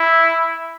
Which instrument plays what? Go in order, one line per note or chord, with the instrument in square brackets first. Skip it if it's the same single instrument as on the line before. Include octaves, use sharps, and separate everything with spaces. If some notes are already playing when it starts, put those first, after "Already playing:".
Already playing: [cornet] E4